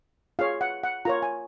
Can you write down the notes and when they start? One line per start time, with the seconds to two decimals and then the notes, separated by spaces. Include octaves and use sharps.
0.39 F4 G#4 C#5 F5
0.61 F#5
0.83 F#5
1.05 F4 A#4 C#5 A#5
1.22 G#5